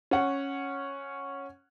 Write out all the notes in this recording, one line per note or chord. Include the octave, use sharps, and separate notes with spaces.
C#4 F#5